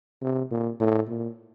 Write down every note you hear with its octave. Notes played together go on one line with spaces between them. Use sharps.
C3
A#2
A2
A#2